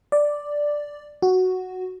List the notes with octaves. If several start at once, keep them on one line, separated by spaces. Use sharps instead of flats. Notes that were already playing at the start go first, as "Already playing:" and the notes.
D5
F#4